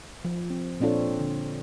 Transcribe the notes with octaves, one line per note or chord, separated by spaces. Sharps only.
F3
C4
A#2 C4 D4 F4 A4 C#5
D3